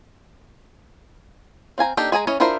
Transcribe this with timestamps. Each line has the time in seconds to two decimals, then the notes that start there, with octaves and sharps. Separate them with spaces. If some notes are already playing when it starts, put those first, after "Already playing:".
1.78 C4 F5 G#5 A#5
1.97 A#3 D4 D#4 G4 A4
2.12 G#3 G#4 G#5 A#5
2.27 E3 C#4 C#5 D#5
2.40 D4 E4 F4 A#4 C5